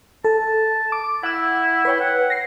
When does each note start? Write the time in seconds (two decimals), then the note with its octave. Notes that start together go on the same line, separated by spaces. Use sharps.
0.24 A4 A5
0.92 D6
1.23 E4 F#5 E6
1.85 B4 C#5 G5
2.00 F#5
2.30 A#6 C7